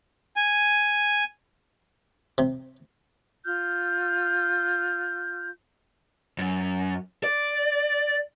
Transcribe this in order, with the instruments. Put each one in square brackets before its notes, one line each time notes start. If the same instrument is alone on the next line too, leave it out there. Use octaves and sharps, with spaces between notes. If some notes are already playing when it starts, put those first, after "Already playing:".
[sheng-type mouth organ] G#5
[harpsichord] C3
[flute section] F4 F6 G6
[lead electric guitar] F#2
D5